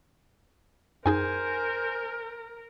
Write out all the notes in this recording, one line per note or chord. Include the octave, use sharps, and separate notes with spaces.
F#2 D#4 G#4 A#4 C5 G#5